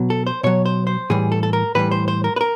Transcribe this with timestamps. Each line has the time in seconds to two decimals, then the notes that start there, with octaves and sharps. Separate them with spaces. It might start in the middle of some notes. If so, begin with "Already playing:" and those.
Already playing: B2 F#3
0.10 A4
0.27 C5
0.43 B2 F#3 C#5
0.66 C5
0.87 C5
1.10 A2 E3 G3 G#4
1.32 A4
1.43 A4
1.53 A#4
1.75 A2 E3 G3 B4
1.91 C5
2.08 C5
2.24 A#4
2.36 B4
2.41 A#4